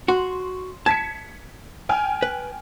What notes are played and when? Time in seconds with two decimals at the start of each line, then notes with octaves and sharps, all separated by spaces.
0.08 F#4 C6
0.86 A5 G#6 B6 C#7
1.89 G5 G#5 F6
2.22 B4